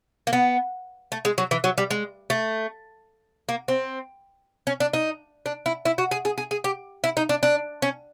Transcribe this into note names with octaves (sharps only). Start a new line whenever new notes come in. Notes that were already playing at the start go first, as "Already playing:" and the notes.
A#3
B3
A3
G#3
F#3
E3
F#3
G3
G#3
A3
A#3
C4
C#4
D4
D#4
D4
E4
E4
F#4
G#4
G#4
G#4
G#4
G4
E4
D#4
D4
D4
C#4